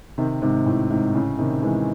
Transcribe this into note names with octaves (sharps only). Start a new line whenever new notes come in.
C3 D#3
G#2 C3
A2
G#2 C3
A2 C#3
C3 D#3
E3 G#3